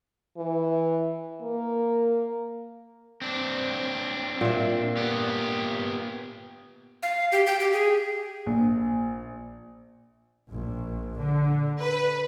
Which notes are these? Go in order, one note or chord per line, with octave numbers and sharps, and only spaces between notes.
E3
A#3
C4 D4
A#2 E5
B3 G4
F5
G4
G5
G4
G#4
A#1
A#1
D3
B4